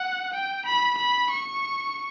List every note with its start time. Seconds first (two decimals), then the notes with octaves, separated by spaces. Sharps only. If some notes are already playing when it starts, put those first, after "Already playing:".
Already playing: F#5
0.33 G5
0.66 B5
0.98 B5
1.30 C#6